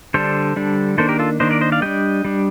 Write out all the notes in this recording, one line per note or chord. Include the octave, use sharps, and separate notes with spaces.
D3 G3 D4 A4 C5
D3 G3 D4
D#3 A#3 D4 A4 C5
G4 A#4
F4 A4
D#3 A#3 D4 C5 D#5
A#4 D5
C5 D#5
D5 F5
G3 D4 D#5 G5
G3 D4